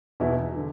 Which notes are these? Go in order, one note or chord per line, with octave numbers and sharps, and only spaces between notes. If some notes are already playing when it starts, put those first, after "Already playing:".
E2 B2 B3 E4
D3